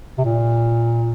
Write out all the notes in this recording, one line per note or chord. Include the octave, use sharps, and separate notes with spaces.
C3
A#2